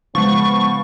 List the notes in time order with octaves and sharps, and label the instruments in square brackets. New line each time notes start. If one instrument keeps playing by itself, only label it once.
[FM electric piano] C#3 G#3 [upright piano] F3 [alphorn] B3 [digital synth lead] C#6